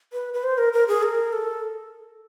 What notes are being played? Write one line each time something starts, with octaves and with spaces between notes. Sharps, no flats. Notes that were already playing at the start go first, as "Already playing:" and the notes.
B4
B4
C5
A#4
A#4
G#4
A#4
A4